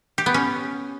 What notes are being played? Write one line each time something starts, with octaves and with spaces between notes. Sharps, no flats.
G4
B3
C#4